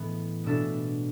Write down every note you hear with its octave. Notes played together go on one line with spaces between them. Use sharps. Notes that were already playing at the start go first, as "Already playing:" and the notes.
Already playing: A2 E3 G#3 B3
B2 G#3 D4 A4 E5